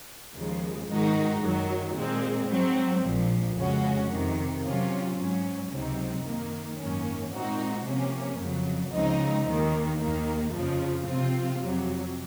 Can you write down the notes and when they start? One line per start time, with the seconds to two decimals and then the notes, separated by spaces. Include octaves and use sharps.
0.35 D#2 C#3 F3 G#3
0.88 G#2 D#3 G#3 D#4 F#4
1.42 F#2 D#3 F#3
1.95 A#2 G#3 C4
2.50 G#2 F#3 C4
3.03 A#1 A#2 F3
3.57 F2 C#3 G#3 C#4 F#4
4.10 F2 C3 D#3
4.64 C3 F#3 C#4 F4
5.18 G#2 F#3 C#4
5.71 C#2 C3 F#3 C4 D#4
6.24 F#2 D#3 A#3
6.78 G#1 F#2 D#3 A#3 C#4
7.32 A#2 G#3 C4 D#4 F#4
7.85 C3 F3 A#3 C#4
8.39 F2 C#3 F#3
8.93 C#2 C#3 F3 C4 D#4
9.46 D#2 D#3 A#3
10.00 D#2 D#3 A#3
10.54 F2 C#3 F3
11.08 C3 F3 C4 F4
11.61 F2 C3 F#3